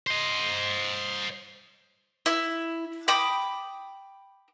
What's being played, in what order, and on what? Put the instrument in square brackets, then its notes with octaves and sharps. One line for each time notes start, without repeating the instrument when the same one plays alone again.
[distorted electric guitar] C5 D#5
[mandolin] E4
G5 B5 D6 D#6